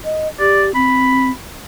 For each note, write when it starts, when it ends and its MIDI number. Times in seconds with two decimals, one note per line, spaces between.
0.05 0.28 75
0.39 0.74 67
0.39 0.66 74
0.75 1.30 60
0.75 1.30 83